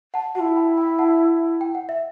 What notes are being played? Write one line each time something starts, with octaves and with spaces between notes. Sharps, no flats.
F#5 A5
E4 F#4 F#5 A5
G5 B5
G5 B5
F#5 A5
G5
F#5
E5